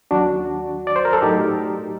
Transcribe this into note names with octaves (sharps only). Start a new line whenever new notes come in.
D#2 D#3 F#3 D4 F#4
D5
C5
A#4
A4
A2 F#3 D#4 G4